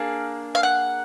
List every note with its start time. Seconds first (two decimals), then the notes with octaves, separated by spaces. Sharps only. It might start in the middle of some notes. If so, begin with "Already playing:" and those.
Already playing: A#3 D4 G#4 F5
0.55 F5
0.63 F#5